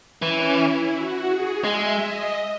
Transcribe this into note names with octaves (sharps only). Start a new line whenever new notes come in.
E3 C#4
E4
F#4
G#4
G#3 E5
D#5